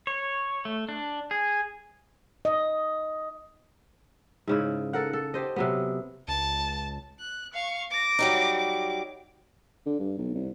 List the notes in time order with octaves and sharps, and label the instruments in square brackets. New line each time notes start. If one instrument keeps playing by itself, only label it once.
[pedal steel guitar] C#5
A3
D4
G#4
[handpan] D#5
[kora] G#2 C#3 E4
A4 A#4 F#5
A4
G4 C5 D#5
C3 F#3 B3
[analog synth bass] C#2 [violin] A5
[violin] F#6
F5 C#6
D6 A#6
[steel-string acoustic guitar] F#3 G3 D#4
[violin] D6
[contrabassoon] D3
G2
B1
C2